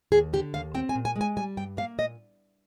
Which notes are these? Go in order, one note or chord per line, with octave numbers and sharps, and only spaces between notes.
D#2 G#4
D3 G4
D#2 F5
C4 G5
G#5
A#2
G#5
G#3
G#5
G3 G#5
G2 G5
A#3 F5
A#2 D#5